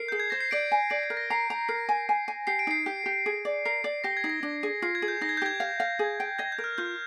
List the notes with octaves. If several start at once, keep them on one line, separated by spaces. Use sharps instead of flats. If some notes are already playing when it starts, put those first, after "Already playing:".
Already playing: A#4 C7
G#4 G6
G#6
C5 A#6
C7
D5 D7
G#5
D5 D7
C7
A#4
A#6
A#5 C7
A#5
A#4 C7
G#5
G#5
G#5
G4 C7
D7
D#4 C7
G4
G4
G#4
D5
A#4 C7
D5
G4 A#6
G#6
D#4
A#6
D4
G#4
F4 C7
G#6
G#4
G6
D#4 A#6
G#6
G6
G4 G#6
F5
F5
G#4
G5
D#5 G#6
G6
A#4
F6
F4 G6